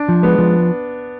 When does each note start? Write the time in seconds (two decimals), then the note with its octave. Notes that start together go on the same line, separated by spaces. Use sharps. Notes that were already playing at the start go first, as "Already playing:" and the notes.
Already playing: D4
0.09 F3
0.23 G#3 B3
0.38 F3